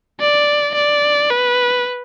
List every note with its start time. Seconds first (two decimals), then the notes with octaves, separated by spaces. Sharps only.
0.20 D5
0.75 D5
1.30 B4